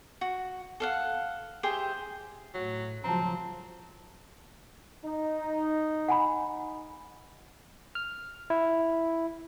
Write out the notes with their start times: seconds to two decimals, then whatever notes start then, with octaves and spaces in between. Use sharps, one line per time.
0.21 F#4
0.80 A4 F5 F#5
1.63 G4 G#4 C5 E5
2.54 A2 F#3
3.04 C#3 F3 F#3 C4 A5 A#5
5.04 D#4
6.08 F#5 G#5 B5
7.95 F6
8.50 E4